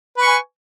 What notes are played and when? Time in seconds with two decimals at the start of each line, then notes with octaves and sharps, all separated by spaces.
0.18 B4
0.22 C#6
0.26 G#5